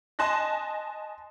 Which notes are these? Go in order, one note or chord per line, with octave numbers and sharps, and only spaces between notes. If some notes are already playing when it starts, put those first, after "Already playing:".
D#5 G#5 A5 C6 F#6 A#6